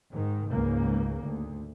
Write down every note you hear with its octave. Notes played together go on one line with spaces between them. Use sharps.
G#2 D#3
C#2 G#2 C#3 A#3
D2